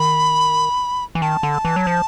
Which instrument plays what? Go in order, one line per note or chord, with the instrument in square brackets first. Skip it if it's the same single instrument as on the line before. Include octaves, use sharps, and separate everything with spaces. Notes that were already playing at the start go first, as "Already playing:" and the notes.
Already playing: [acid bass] D#3 [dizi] B5
[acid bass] E3
[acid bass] D#3 [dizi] A5
[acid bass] D3
E3
F#3
F3